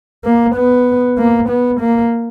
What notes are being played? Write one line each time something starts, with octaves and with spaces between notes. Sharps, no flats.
A#3
B3
A#3
B3
A#3